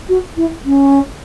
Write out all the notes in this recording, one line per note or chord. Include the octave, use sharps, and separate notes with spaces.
F#4
E4
C#4